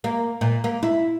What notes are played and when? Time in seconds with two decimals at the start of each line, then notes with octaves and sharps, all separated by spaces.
0.04 A#3
0.41 A#2
0.64 A#3
0.83 E4